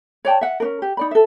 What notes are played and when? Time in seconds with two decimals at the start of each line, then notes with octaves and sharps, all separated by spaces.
0.25 C#5 D5 G5 A5
0.41 E5 F#5
0.60 C#4 D4 A#4
0.82 G4
0.97 D#4 D5 B5
1.11 A4 E5